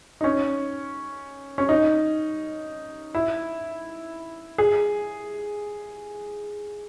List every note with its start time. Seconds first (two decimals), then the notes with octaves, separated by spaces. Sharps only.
0.21 D#4
0.24 C#4
1.58 C#4
1.69 D#4
3.15 E4
4.58 G#4